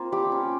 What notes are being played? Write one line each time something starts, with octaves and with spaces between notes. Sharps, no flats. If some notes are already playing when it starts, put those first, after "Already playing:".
Already playing: A#3 C4 F4
G3 G4
C#4